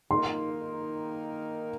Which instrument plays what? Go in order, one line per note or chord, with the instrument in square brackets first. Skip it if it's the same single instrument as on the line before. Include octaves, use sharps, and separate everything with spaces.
[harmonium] D#3 A#3 D#4 A#4 [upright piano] C6